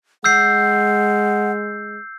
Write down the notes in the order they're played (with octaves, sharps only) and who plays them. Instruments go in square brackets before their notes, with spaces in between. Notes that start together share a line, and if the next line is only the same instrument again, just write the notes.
[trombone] G#3 [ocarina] F#5 [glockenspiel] E6 G6 C7